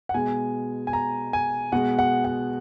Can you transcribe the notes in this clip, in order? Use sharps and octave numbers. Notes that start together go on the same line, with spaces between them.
F#5
B2 G#3 G#5
G#5
A#5
G#5
B2 G#3 F#5
F#5
F#5